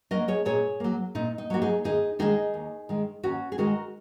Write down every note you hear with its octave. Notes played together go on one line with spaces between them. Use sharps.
F#3 A#3 A#4 D#5
G#4 C#5
A#2 G#4 C#5
F#3 A#3
A#2 D#4
D#4
F#3 A#3 F#4
D#4 G#4
D#2 D#4 G#4
D#3 G#3 D#4 G#4
D#2
D#3 G#3
D#2 C#4 F#4
G#4
D#3 G#3 F#4 A#4